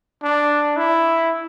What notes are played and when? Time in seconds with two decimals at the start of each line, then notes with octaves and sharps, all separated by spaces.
0.23 D4
0.77 E4